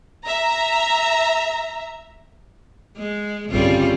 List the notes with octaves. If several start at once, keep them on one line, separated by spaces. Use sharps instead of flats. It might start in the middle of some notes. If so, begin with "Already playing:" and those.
E5 A#5
G#3
G1 C#3 G3 C4 F4